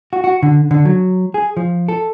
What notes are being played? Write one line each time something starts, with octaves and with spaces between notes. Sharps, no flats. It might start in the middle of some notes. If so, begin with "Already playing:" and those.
F#4
F#4
D3
D3
F#3
G#4
F3
A4